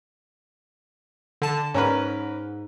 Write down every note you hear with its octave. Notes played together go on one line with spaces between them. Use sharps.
D3 A5
G#2 C#4 A#4 B4